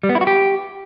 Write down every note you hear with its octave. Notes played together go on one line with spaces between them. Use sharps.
G3
B3
E4
F#4
G4